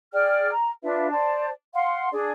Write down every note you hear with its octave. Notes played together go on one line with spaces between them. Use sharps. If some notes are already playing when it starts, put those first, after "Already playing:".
G#4 D5 G5 F6
A#5
D4 F4 B4 E5
C5 D5 A5
F5 F#5 C6
D4 G#4 D5